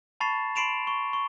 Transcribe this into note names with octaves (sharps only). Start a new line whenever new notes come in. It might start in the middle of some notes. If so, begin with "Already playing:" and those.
A5 B5 C#6 A6 C7 E7
B5 C6 C7 D7 E7 F7
C#6
C#6